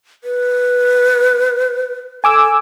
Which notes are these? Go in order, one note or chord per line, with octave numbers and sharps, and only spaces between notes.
B4
A4 G#5 D6 E6